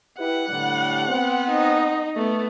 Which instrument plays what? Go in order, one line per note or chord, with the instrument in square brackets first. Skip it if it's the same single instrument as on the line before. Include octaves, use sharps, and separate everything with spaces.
[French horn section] E4 G4 B4 [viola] F#5
[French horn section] A2 D3 G3
B3 C4
[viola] D#4
A3 B3